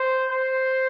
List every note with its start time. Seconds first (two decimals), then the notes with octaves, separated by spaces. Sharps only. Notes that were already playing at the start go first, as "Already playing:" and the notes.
Already playing: C5
0.30 C5